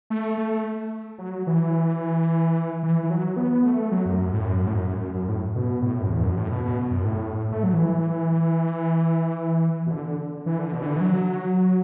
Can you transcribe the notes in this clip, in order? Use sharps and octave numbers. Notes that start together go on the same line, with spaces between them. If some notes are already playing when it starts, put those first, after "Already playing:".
A3
A3
F#3
E3
E3
E3
F#3
B3
A3
F#3
F#2
F#2
A2
F#2
A2
F#2
F#2
F#2
A2
B2
A2
F#2
E2
F#2
A2
B2
B2
F#2
A2
A3
F#3
E3
B2
D3
E3
D3
B2
E3
D3
E3
F#3